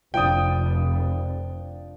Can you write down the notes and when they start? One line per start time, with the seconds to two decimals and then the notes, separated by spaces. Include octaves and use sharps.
0.14 F1 F3 D4 G5 D#6